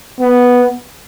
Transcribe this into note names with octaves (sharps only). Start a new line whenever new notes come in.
B3